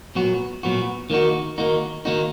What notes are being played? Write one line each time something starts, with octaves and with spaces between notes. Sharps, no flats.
A#2 F#3 B3 F#4
A#2 F#3 B3 F#4
D#3 A#3 D#4 F#4
D#3 A#3 D#4 F#4
D#3 A#3 D#4 F#4